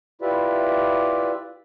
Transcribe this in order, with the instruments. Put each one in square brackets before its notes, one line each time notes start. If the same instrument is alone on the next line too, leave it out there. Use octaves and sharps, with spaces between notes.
[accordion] E4 F4 G4 B4 D5 E5